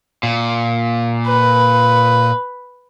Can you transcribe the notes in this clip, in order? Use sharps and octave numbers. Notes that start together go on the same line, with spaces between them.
A#2
B4